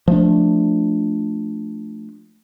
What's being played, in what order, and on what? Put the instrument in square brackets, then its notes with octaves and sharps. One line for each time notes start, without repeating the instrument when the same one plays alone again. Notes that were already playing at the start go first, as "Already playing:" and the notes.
[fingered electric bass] F3 A3 D4